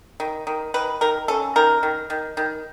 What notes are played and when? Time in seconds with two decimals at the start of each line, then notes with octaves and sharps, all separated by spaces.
0.20 D#3
0.47 D#3
0.74 D#3 B4
1.01 D#3 A#4
1.28 C#4 A4
1.56 D#3 A#4
1.83 D#3
2.10 D#3
2.37 D#3